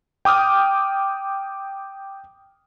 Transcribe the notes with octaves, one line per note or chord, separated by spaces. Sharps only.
G5 D6 D#6 F6